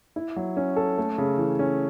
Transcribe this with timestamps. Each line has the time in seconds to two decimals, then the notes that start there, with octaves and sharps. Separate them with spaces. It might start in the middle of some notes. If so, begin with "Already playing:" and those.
0.16 E4
0.36 F#3
0.57 C#4
0.76 A4
0.98 A3
1.18 C#3
1.38 E3
1.59 C#4